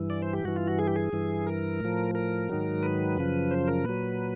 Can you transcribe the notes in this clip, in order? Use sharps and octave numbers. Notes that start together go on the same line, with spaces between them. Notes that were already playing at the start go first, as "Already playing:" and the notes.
Already playing: G2 E3
D5
C5
G4
G2 E3 F#4
F4
F#4
G#4
G4
G#4
G2 E3
A#4
A2 F3
A#4
G#2 D#3 F#3
B4
F#2 C#3 F3
C5
A#4
A#2 F#3 B4